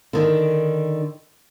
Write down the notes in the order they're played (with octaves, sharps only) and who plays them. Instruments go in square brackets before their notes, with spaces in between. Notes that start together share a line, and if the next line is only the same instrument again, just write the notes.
[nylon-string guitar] D3 D#3